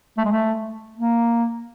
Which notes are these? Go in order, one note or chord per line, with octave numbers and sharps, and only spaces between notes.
A3
G#3
A3
A#3